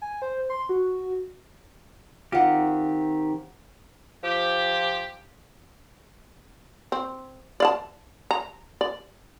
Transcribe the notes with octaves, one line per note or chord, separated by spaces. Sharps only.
G#5
C5
C6
F#4
D#3 C4 F4 G4 F#5
F3 G4
C4
D5 F5 A5
A#5
D5